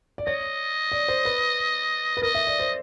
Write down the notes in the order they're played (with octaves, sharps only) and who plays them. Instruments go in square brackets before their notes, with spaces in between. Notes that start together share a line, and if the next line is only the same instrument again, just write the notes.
[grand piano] D5
[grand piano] C#5 [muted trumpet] D#5
[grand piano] D5
C5
B4
B4
[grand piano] A#4 [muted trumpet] D#5
[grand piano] E5
D5
C5